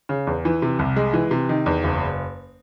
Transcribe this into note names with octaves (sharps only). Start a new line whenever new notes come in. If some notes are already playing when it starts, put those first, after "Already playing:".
C#3
E2
E3
C3
C2
G#3
E3
C3
D#3
E2
F#1